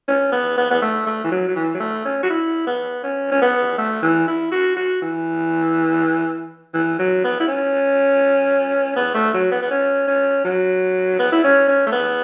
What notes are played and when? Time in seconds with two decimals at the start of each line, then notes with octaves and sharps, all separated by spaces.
0.08 C#4
0.32 B3
0.57 B3
0.71 B3
0.82 A3
1.06 A3
1.24 E3
1.31 F#3
1.48 F#3
1.55 E3
1.74 F#3
1.80 A3
2.05 C#4
2.23 F#4
2.30 E4
2.67 B3
3.03 C#4
3.31 C#4
3.42 B3
3.78 A3
4.02 E3
4.28 E4
4.51 F#4
4.76 F#4
5.02 E3
6.74 E3
6.99 F#3
7.24 B3
7.40 E4
7.48 C#4
8.96 B3
9.14 A3
9.34 F#3
9.51 B3
9.62 B3
9.71 C#4
10.07 C#4
10.44 F#3
11.19 B3
11.32 E4
11.44 C#4
11.68 C#4
11.86 A3
11.92 B3